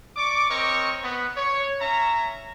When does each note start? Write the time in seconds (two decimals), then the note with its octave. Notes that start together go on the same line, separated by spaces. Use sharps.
0.17 D5 C#6 D6
0.51 C4 A#4 C#5 D#5 C#6
1.03 B3
1.37 C#5
1.81 C#4 E5 A#5